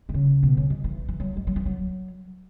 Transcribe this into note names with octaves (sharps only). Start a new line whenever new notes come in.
D#3
C#3
B2
C#3
D#3
E3
E3
F#3
G#3
F#3
E3
F#3